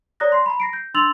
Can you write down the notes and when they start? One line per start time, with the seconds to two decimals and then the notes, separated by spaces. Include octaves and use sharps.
0.20 C#5 D5 A#5 D#6 F#6 A#6
0.32 C6 C7
0.46 A#5 B5
0.60 A#6 C7 D7
0.73 G6
0.94 D4 C6 E6 A6 F7 F#7